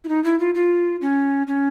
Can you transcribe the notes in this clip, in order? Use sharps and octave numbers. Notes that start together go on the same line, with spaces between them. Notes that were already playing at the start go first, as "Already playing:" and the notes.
E4
D#4
E4
F4
F4
C#4
C#4